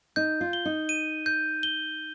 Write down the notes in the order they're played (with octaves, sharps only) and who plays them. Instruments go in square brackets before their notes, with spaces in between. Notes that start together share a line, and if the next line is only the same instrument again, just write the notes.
[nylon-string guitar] D#4 [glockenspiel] G6
[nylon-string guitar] F4
[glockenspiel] G7
[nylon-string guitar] D#4
[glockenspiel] D#7
G6
G7